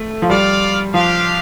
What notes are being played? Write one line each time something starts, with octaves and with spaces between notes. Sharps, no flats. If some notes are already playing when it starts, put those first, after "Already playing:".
Already playing: A3
F3
G3 F4 D5 F5
F3 D4 G4 F5